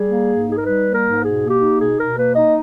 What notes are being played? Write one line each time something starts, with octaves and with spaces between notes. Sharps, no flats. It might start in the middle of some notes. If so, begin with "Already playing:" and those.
Already playing: G3 G#4
A#3
G#2
D#4 G#4
A#4
G3 B4
A#3
A#4
G#2
B2 G#4
A#3
G4
D#4
B2 G#4
B2 A#4
A#3 B4
D#4 D#5